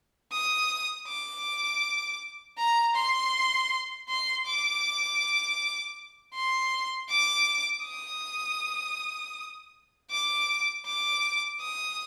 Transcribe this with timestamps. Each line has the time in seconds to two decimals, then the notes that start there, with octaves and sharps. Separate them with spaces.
0.32 D#6
1.08 D6
2.58 A#5
2.95 C6
4.09 C6
4.46 D6
6.34 C6
7.10 D6
7.84 D#6
10.11 D6
10.86 D6
11.61 D#6